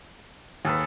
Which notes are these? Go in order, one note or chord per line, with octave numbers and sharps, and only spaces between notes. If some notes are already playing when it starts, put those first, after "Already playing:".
D#2 G#4 A4 B4